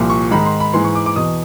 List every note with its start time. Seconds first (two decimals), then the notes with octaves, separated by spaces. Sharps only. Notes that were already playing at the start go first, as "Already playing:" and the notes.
Already playing: C2 A#2 F3
0.10 C#6
0.31 G#2 D#3 B5
0.46 C6
0.60 B5
0.73 G#2 E3 C6
0.85 C#6
0.95 D6
1.06 D6
1.16 E2 B2 D#6